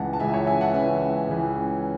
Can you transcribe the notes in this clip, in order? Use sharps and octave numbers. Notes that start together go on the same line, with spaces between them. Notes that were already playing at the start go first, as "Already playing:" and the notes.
Already playing: C#2 C#3 E3 F#5 A5
A5
C#2 C#3 E3 E5 G#5
C#5 E5
E5 G#5
F#5 A5
C#2 C#3 E3 E5 G#5
C#2 C#3 E3